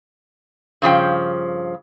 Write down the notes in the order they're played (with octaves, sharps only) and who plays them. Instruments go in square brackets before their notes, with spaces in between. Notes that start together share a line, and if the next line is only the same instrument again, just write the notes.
[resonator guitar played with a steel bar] G2 C#3 F3 G5